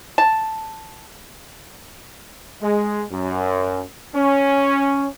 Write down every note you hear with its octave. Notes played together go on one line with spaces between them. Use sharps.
A5
G#3
F#2
C#4